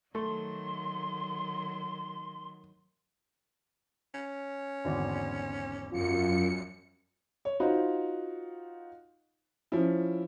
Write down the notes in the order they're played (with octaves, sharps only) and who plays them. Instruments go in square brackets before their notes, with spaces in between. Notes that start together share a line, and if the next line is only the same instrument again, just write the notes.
[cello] D#3 F#3 [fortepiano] A3 [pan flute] C6
[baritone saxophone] C#4
[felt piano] G#1 E2 D3
[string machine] F#2 C#7 [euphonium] F4
[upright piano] C#5
D#4 F4 F#4 C5
F3 C#4 E4